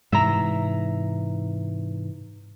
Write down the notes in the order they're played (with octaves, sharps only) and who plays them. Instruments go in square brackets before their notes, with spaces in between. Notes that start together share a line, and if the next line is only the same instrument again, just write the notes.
[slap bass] G#2 C3 E3 [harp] E5 A#5